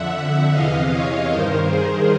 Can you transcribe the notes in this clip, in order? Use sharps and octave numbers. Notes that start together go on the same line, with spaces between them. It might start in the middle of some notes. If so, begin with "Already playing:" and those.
Already playing: F2 D3 E5 F#5
E5 F#5
E2 C3 E3 D#5 F5
C#5 D#5
G2 D#3 A#4 C5
G#4 A#4